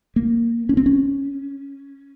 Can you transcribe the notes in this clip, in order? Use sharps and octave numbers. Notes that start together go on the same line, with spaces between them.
A#3
C#4
C4
C#4